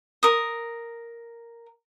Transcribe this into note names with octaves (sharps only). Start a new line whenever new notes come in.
A#4 D#6